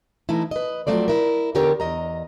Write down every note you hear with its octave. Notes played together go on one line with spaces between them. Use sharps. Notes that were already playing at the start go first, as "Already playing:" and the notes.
E3 A3 D#4 E4
B4 D#5
F3 F#3 A3 C4 D5
E4 A#4
E2 D3 B3 G4 A#4 C#5
E2 D#5 A#5